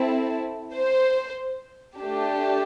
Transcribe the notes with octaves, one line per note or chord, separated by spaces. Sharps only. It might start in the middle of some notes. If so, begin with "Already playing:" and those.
Already playing: C4 E4 A4
C5
A3 D4 G4